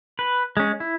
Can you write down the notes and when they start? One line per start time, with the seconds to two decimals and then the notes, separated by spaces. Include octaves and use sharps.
0.19 B4
0.57 G#3 C#4
0.80 E4